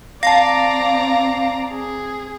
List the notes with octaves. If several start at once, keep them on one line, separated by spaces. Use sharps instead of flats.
C4 D5 F5 A5 A#5 A#6
G#4